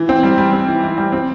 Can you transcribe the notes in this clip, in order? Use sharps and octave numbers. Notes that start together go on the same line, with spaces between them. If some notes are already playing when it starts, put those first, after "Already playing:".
Already playing: E3
C4
G3
G3
C4
E3
E3
G3
C4